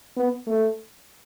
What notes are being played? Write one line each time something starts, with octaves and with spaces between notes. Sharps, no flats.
B3
A3